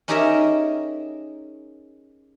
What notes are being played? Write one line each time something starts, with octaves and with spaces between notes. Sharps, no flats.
C#4 D#4 G4 G#4 A#4 E5